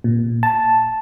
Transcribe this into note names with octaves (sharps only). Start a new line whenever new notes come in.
A#2
A5